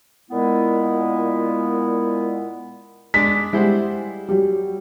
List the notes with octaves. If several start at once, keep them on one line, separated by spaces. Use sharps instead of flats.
A#2 G#3 B3 E4
G#3 D4 B6
G3 G#3 E4 C5 F#5
F#3 G3